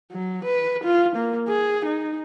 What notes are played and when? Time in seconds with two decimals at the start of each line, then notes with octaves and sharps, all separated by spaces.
0.12 F#3
0.45 B4
0.84 F4
1.16 A#3
1.49 G#4
1.86 D#4